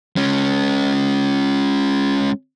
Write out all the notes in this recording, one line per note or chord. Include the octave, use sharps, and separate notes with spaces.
G#3 C#4